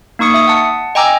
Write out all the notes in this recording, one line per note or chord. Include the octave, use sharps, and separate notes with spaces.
A#3 D#4 C#6 D#6 C#7
E5 D#6
F#5 A5
D#5 G5 G#5 A#5 D6 E6